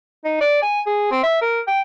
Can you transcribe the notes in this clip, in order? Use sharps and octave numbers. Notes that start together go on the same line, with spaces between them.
D#4
D5
G#5
G#4
C4
E5
A#4
G5